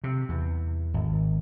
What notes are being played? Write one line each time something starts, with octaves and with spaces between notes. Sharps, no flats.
C3
E2
G#1